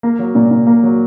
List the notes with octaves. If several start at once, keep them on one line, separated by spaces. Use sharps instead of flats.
A#3
F#3
A#2
A#2
A#3
F#3